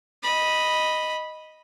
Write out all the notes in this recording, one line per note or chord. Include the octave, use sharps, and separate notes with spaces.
D#5 B5